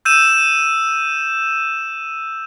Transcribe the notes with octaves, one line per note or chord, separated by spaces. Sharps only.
E6 G6 D#7 E7